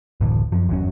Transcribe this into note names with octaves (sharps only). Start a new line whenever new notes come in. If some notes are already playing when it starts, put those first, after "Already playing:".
F#1 D2 A2 E3
F#2 F3
G1 E2 F#3 C#4